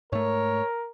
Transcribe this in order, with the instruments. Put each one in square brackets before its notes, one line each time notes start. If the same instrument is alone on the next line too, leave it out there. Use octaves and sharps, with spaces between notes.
[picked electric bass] G#2 A3 [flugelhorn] A#4 [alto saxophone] C#5